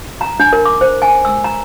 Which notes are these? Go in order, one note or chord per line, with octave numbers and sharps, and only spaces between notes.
A#5
D4
A#4
D6
C5
G#5
E6
A#5